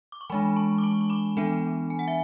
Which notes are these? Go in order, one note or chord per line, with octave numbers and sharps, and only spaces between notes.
D6
C#6
E3 G#3 D4 G#5 B5
A5 C#6
D6
A5 C#6
C#6
B5 D6
E3 B3 D4 G#5 B5
G#5
F#5
E5 G#5